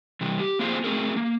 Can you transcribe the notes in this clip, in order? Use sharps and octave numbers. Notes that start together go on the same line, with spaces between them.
C3 E3 G3
G4
A#3 C4 F4 G#4 C5
A3 C4 G#4 A#4
A#3